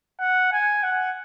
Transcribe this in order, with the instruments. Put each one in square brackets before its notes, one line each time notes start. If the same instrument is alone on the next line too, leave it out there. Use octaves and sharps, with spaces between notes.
[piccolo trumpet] F#5
G#5
F#5